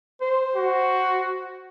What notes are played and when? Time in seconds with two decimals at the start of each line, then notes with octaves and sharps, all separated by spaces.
0.21 C5
0.55 F#4